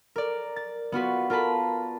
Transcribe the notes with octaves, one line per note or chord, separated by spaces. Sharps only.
A#4 D5
A6
B3 F4 F#4 B4
F4 A#4 B4 A5 B5